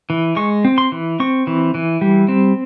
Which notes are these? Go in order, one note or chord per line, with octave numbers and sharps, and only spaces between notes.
E3
G#3 C#6
C4
C6
E3
C4 C#6
E3
E3
G3
C4